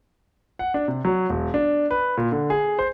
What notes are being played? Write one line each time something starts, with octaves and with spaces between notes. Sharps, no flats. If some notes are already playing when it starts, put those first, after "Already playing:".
F#5
D4
C3
F#3
E1
D4
B4
A#2
D3
G#4
C5